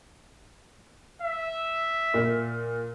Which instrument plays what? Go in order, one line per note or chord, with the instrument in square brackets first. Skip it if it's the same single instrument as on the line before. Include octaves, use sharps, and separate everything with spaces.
[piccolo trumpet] E5
[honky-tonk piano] A#2